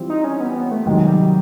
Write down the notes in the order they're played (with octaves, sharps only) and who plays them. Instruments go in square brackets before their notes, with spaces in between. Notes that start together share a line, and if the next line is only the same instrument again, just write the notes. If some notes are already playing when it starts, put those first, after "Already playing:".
Already playing: [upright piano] E3 G3 C4 F4
[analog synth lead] D#4
C#4
B3
B3
A3
[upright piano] C3 D#3 F#3 [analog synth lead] G#3
[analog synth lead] G3